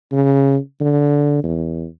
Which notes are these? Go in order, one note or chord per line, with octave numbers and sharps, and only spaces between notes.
C#3
D3
E2